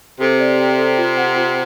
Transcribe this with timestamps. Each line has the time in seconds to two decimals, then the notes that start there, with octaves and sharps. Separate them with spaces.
0.20 C3 A4
0.40 D5
0.59 G5
0.78 A4
0.98 F4
1.17 F#5
1.36 F4